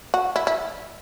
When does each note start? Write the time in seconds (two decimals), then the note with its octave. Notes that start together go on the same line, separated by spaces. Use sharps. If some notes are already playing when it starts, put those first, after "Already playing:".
0.14 F#4
0.36 E4
0.47 E4